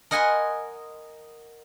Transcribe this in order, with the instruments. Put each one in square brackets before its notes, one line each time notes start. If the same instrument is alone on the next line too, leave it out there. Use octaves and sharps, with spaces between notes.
[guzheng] A#4 D#5 F#5 G#5 B5 C6